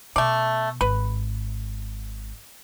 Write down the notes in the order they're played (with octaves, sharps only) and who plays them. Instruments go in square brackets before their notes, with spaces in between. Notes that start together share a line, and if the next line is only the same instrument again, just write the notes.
[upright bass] B2 [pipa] A3 D5
[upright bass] G#1 [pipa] B4